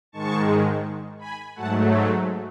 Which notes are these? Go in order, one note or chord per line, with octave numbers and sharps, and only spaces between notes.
G#2 D#3 G#3 A5 C#6
G#5 B5
G#2 F#3 A3 F#5 A5